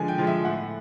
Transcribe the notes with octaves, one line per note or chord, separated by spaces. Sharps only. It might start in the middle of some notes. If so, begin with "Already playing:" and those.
Already playing: D3 F3 G#3 G#5
G5
F3 G#3
E5
A2 F#5